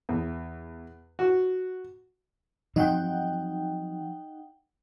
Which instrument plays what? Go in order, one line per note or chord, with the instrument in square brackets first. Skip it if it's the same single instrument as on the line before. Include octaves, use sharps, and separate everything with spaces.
[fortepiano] E2
F#4
[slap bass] F3 F#3 C4 [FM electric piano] D#4 F#5 G5